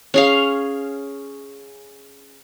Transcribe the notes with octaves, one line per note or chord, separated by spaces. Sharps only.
C#4 G#4 F5